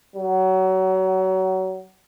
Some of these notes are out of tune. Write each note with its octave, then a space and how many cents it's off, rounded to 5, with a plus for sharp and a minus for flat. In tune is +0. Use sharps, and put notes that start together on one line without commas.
F#3 +25